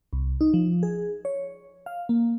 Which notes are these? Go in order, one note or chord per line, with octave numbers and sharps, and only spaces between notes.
C2
D#4
F3
G#4
C#5
F5
A#3